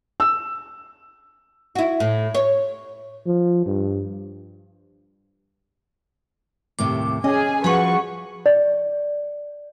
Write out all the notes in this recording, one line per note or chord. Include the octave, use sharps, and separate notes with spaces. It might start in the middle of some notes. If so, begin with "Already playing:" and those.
E6
E4 F#4
A2
C#5
F3
G2
D#2 A2 C3 D6
C#4 G#4 D#5 G#5
F3 F#4 G#4 B4 F#5 C#6
D5